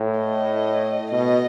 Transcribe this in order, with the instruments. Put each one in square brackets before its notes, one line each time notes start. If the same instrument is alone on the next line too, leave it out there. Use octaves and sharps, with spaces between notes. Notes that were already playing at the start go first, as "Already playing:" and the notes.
Already playing: [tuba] A2
[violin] D#5
[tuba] B2 [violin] D#5